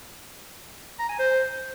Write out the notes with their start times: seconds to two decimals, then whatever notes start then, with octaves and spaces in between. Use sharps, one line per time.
0.99 A#5
1.09 G#5
1.19 C5